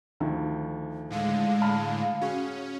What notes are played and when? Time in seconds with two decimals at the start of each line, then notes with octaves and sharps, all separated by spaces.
0.20 D2 D#3 F3
1.10 A2 D3 G#3 F5
1.61 A5 B5 F6
2.21 C#4 F#4 G#4